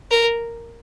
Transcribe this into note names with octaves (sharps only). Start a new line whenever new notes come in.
A#4